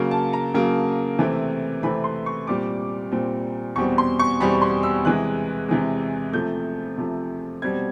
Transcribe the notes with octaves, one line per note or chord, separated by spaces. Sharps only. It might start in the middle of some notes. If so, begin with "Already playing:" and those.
Already playing: C#3 F#3 A#3
A5
A#5
C#3 F#3 A#3
C3 E3 A3 C4
C3 E3 A3 C4 B5
C6
C#6
A#2 G3 C4 D6
A#2 G3 C4
E2 B2 G3 C4 C#6
C6
C#6
E2 B2 G3 C4 B5
C6
E6
C3 E3 G#3 F#6
C3 E3 G#3
C3 F3 A3 G6
C3 F3 A3
B2 G3 C4 G#6